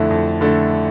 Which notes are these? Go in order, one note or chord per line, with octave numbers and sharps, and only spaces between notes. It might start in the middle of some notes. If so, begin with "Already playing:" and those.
Already playing: F2 D3 A3 E4
F2
D3 A3 E4